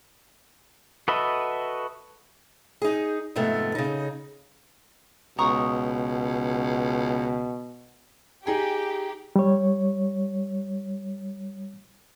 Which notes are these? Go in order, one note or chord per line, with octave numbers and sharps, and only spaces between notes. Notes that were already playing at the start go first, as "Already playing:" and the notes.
F#4 A4 B4 D#5 E5
D#4 G#4
F2 G#2 C3 A3 B3
C#3 D#4
C#2 B2 A#5 C#6 D#6
D#4 G4 G#4 G5
G3 C#5